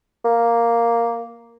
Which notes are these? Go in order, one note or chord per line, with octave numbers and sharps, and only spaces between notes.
A#3